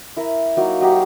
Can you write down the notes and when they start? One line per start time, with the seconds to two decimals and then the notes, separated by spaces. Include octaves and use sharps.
0.17 E4 A#4
0.57 F#3 A#3 D#4 E4
0.81 F#3 D#4 G4 F5